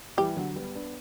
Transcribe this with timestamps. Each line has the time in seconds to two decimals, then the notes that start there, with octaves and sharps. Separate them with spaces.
0.17 E3 G3 G4
0.37 D3 F#3
0.56 G3 B3
0.75 B3 D4